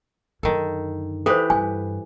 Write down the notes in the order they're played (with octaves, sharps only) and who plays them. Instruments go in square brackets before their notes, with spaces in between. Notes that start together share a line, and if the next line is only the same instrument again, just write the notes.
[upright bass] F#2 D3 [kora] D#3 A4
[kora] E3 G4 B4 [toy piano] A4 C5
[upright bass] G2 [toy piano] G#5